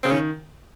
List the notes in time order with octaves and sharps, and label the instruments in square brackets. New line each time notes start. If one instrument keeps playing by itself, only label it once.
[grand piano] C#3 [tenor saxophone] C4
[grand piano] D#3 [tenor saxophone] C#4